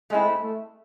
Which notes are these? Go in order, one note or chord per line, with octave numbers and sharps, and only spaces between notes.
G#3 A3 C4 E4
A3